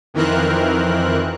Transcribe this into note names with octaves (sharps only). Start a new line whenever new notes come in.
F2 D#3 E3 C4 A#4 F#6